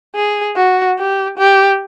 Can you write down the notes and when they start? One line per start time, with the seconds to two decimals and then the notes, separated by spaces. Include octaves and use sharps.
0.16 G#4
0.56 F#4
0.98 G4
1.38 G4